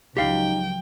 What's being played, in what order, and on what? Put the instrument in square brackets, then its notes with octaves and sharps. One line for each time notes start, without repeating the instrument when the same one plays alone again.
[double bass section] C#2 F3 F#3 [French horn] D#4 [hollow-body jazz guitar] G4 F5 [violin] G5